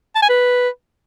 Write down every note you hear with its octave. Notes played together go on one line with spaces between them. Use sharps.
A5
G#5
B4